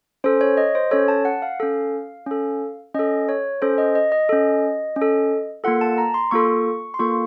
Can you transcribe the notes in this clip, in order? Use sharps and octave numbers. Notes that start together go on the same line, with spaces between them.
C#4 A4 C5
C#5
D#5
C5
C#4 A4 C#5
A5
F#5
F5
C#4 A4
C#4 A4
C#4 A4 D#5
C#5
C#4 A4 C5
D#5
D#5
D#5
C#4 A4
C#4
A4
A#3 F4 A4 F#5
A5
A#5
C6
A#3 F4 A4 C#6
C6
A#3 F4 A4 C#6